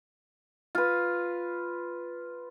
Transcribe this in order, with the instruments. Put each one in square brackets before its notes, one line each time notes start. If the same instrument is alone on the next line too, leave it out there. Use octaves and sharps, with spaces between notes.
[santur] F4 B4